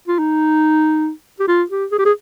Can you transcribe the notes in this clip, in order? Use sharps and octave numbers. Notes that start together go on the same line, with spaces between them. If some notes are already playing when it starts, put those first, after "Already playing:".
F4
D#4
G4
F4
G4
G#4
G4
G#4